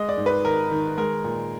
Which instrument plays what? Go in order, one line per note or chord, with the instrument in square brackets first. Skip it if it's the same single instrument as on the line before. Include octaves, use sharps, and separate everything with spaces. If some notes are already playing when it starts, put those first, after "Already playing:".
Already playing: [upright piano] G#3 D#5
D5
G#2
B4
D#3 A#4
D#3
G#3 A#4
A#2